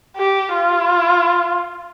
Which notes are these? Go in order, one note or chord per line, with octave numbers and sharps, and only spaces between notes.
G4
F4